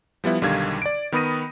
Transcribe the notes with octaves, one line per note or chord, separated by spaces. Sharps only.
F3 G3 B3 E4
B1 D3 D#3 G3 F5 G#6
D5 D7
D#3 B3 B5 D#6 A#6 D#7